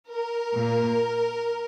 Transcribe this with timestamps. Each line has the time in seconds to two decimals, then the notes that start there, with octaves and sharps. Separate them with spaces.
0.10 A#4
0.54 A#2 A#3